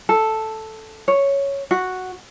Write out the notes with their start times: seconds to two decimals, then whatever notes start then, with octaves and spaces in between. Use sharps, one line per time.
0.09 A4
1.08 C#5
1.71 F#4